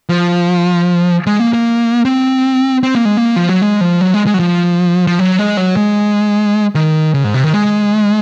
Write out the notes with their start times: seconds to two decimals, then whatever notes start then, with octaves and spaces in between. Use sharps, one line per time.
0.09 F3
1.27 G#3
1.40 A#3
1.53 A#3
2.05 C4
2.83 C4
2.95 A#3
3.05 G#3
3.17 A#3
3.36 F3
3.49 F#3
3.62 G#3
3.81 F3
4.01 F#3
4.14 G#3
4.26 G#3
4.34 F#3
4.40 F3
5.07 F3
5.19 F#3
5.39 G#3
5.57 F#3
5.77 G#3
6.75 D#3
7.14 C#3
7.24 G#2
7.34 C3
7.44 D#3
7.53 G#3